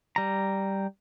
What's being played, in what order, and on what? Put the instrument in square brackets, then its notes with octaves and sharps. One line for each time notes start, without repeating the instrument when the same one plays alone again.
[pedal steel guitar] G3 A#5